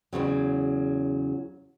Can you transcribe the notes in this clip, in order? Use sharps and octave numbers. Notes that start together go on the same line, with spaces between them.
E2 G#2 C#3 F#3